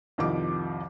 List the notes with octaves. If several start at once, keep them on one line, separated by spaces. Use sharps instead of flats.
C2 F2 D#3 F3 D6